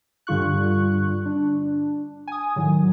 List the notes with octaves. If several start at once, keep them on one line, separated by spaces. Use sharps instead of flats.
G2 D3 G3 F4 C#6 F#6
D4
G#5 D#6
A2 D#3 F#3